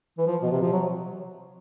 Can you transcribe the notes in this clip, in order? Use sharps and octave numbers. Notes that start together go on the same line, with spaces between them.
E3
F3
B2
C3
F3
F#3